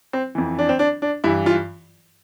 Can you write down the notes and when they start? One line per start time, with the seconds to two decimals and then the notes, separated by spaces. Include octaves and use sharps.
0.13 C4
0.35 F2 E3
0.59 D4
0.69 C4
0.79 D4
1.02 D4
1.24 G2 E3 E4
1.46 F4